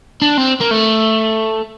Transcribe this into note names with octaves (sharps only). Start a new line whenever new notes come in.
D4
C4
A#3
A3